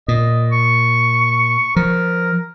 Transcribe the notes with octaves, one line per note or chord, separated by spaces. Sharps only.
A#2 D#5
C#6
F3 A#4